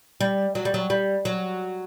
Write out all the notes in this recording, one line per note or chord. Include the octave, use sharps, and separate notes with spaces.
G3
F#3
G3
F#3
G3
F#3